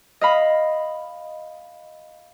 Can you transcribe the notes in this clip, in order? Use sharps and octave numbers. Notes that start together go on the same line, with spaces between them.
D#5 F5 B5